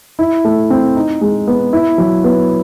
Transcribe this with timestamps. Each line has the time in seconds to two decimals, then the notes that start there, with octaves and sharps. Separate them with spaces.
0.19 E4
0.45 A3
0.70 C4
0.96 D#4
1.21 G#3
1.48 B3
1.73 E4
1.98 F#3
2.24 B3